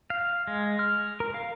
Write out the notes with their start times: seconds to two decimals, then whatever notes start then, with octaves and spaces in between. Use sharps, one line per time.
0.10 F5
0.47 G#3
0.79 F6
1.20 A#4
1.34 F5